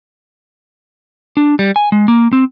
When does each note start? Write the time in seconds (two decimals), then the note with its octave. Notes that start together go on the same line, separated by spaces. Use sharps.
1.37 D4
1.59 G3
1.76 G#5
1.92 G#3
2.08 A#3
2.33 C4